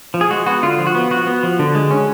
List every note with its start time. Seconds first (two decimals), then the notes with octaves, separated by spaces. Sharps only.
0.14 F3
0.21 G#4
0.31 G#3 F#4
0.46 B3 F#4
0.63 D3 F4
0.79 F3
0.87 F#4
0.95 B3
1.10 F3 F#4
1.27 B3
1.43 F3
1.59 D3
1.75 G#3
1.91 C#4